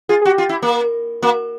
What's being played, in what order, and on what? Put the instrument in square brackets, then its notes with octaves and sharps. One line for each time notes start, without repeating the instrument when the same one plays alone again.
[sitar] F4 [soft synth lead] G#4
[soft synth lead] G#4
[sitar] F#4 [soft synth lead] G4
[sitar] F4
E4
A#3
[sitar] A#3 [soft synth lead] F#4